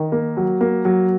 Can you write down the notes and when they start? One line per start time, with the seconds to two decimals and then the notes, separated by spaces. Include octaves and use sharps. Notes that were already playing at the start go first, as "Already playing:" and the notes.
Already playing: D#3
0.12 A#3
0.37 F#3
0.61 A#3
0.85 F#3